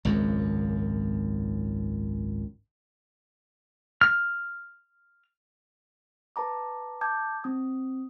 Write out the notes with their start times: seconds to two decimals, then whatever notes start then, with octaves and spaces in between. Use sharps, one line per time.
0.05 G#1 C#2 F#2
4.01 F6
6.36 B4 A5 A#5 D6
7.01 A5 D6 G6 G#6
7.44 C4 D#6